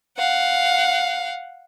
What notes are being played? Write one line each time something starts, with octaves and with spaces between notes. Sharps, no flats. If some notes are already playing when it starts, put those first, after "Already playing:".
F5 F#5